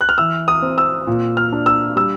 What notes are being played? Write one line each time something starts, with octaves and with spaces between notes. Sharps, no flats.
F#6
F6
E3 E6
D#6
C4
E6
A#2
F6
D4
E6
G3 E6